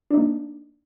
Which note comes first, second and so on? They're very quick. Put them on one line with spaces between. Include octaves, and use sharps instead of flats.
D4 D#4 A#3